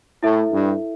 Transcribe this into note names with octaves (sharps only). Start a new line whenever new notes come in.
A2 E4 A4 E5
G2